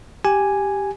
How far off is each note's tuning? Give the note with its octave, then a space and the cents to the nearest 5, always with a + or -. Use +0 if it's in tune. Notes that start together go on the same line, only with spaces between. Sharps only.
G4 +0 G#5 +0